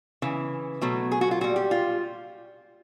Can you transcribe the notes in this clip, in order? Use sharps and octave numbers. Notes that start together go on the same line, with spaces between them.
C#3 E3
B2 F#3 A3
G#4
F#4
F4
A#2 G3 F#4
G4
F4